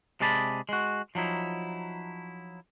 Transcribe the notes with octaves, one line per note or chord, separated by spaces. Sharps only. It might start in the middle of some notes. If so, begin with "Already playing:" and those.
C3 G#3 G#4 D5 A5 B5
G#3 F#4
F3 F#3 D#4 E4